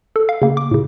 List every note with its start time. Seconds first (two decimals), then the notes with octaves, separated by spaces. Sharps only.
0.16 A4
0.29 F5
0.42 C#3 A#3
0.57 D6
0.71 A2 C#3